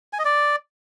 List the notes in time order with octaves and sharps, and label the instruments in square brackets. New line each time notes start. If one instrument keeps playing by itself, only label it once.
[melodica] G#5
D#5
D5